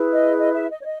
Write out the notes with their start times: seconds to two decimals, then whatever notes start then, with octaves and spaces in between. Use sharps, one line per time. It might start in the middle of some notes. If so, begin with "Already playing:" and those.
Already playing: E4 G#4 B4
0.12 D#5
0.37 D#5
0.53 E5
0.69 D#5
0.80 C#5
0.85 D#5